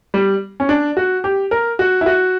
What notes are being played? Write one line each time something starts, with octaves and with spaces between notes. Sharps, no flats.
G3
C#4
D4
F#4
G4
A#4
F#4
E4
F#4